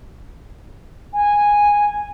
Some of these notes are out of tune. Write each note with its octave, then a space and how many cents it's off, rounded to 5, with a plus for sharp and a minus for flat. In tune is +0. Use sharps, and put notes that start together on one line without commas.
G#5 -10